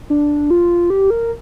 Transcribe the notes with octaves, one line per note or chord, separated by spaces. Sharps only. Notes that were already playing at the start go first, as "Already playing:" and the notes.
D4
F4
G4
A#4